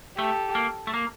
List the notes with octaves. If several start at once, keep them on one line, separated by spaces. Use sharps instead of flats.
A3 G4 A4
A#3
A3
A#3